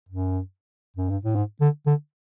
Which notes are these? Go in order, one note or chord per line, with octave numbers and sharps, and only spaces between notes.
F#2
F#2
G2
A2
G#2
D3
D3